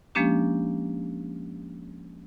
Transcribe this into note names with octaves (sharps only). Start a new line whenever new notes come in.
F3 G#3 A#3 C#4 D4 G4